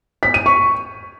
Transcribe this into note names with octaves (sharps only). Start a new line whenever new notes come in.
B6
D#7
C#6